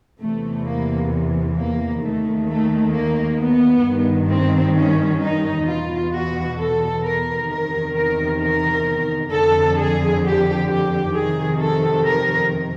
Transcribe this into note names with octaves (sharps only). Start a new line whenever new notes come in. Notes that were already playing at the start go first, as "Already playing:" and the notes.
E2 C3 E3 A3
A#3
A#3
D#2 D#3 A3
A3
A#3
B3
G2 D#3
C4
C#4
D#4
E2 B2 F4
F#4
A4
A#4
E2 C3 D#3 A#4
A#4
A#4
F2 D3 A4
G#4
G4
G4
F2 C3 D#3 G#4
A4
A#4